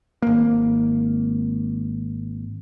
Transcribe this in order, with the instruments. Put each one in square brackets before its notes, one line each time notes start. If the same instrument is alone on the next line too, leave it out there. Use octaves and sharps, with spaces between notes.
[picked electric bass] G#1 A#3